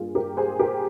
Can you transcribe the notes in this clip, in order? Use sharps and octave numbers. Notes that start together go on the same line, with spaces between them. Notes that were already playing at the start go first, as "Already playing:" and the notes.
Already playing: G2 A#3 D4 F4 G#4
G4 A#4
G#4 C5
G4 A#4